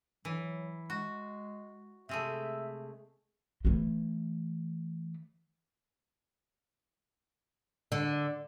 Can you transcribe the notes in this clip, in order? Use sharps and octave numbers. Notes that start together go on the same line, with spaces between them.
E3 F#3
G#3 F#4
C3 G#3 A3 E5
E3 A3
D3